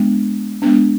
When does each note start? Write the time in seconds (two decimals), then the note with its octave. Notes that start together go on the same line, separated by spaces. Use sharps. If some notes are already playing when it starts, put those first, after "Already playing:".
Already playing: G#3 B3 D4
0.62 G#3 B3 D4